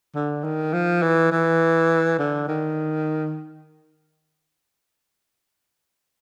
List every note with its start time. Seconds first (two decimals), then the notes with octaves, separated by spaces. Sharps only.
0.15 D3
0.44 D#3
0.73 F3
1.02 E3
1.32 E3
2.19 D3
2.48 D#3